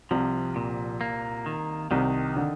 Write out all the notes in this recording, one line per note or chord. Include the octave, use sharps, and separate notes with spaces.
C2 C3 F3
A#2
A#3
D#3
C2 C3 D#3
D3